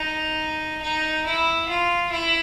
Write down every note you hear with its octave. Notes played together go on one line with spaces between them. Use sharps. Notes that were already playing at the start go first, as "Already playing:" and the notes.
Already playing: D#4
D#4
E4
F4
E4